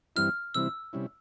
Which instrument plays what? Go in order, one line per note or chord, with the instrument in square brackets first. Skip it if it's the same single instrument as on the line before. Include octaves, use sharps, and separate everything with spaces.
[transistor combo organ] G2 E3 G3 C4 E4 [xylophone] F6
[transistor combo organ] C3 E3 G3 C4 E4 [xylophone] E6
[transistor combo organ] C3 G3 C#4 E4